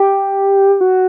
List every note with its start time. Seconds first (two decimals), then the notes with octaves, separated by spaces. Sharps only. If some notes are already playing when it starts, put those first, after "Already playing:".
Already playing: G4
0.81 F#4